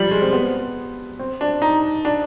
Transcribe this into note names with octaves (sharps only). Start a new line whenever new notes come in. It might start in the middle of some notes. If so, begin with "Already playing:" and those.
Already playing: F3 G3
G#3
C4
B3
C4
D4
D#4
D4